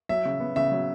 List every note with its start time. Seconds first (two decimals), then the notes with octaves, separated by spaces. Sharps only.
0.09 F#3 E5
0.25 C#3
0.40 B3
0.56 C#3 E5
0.72 F#3